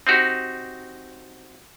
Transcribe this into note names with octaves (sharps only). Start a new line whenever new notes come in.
C4 D#4 F#4 G4